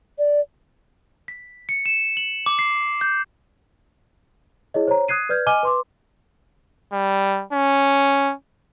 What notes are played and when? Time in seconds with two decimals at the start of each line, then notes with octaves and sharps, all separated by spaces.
0.19 D5
1.28 B6
1.69 C#7
1.86 E7
2.17 F#7
2.46 D6
2.59 C7
3.01 G6
4.74 E4 G#4 C#5 D#5
4.87 C5 C#5 A#5
5.08 D#6 F#6 G#6 C7 D#7
5.29 B4 D5 F6 G6 G#6
5.47 D#5 G#5 D6 F6 D#7 G7
5.63 B4 C6 D6
6.93 G3
7.53 C#4